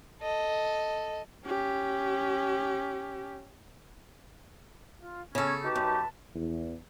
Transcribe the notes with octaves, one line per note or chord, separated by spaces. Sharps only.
A4 D#5
C#4 G4
F4
C#3 C#4 A4 G#6
D#4 F#4 G4 B4 A5
F#2
E2